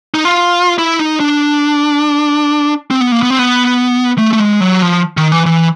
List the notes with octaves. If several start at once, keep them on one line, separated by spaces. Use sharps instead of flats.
D#4
F4
E4
D#4
D4
C4
B3
A#3
B3
C4
B3
A3
A3
G#3
F#3
F3
D#3
E3
E3